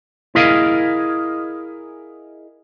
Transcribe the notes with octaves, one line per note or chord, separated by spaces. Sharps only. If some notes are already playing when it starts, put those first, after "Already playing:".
E4 G#4 A#4 D#5 F5